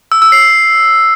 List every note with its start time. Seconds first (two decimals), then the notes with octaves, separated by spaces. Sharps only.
0.12 E6
0.22 E6
0.32 C7